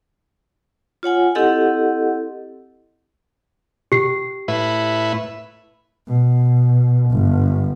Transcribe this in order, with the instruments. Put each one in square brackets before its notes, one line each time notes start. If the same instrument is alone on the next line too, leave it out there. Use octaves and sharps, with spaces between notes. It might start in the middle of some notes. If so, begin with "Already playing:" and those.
[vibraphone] F4 C#5 F#5 G#5
C4 E4 G4 A4 D#5 F#5
[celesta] G4 C7
[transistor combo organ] A2 E4 B4
[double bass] B2
G1